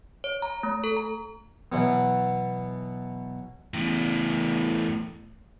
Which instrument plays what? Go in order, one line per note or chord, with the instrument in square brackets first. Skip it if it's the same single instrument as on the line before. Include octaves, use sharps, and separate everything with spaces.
[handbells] C#5
A#5
A3
A4
A#5
[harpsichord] B2 E3 F#3 B3
[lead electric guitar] E2 A2